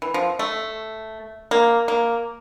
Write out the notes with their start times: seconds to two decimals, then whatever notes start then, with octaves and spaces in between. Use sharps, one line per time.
0.02 E3
0.14 F3
0.39 A3
1.51 A#3
1.88 A#3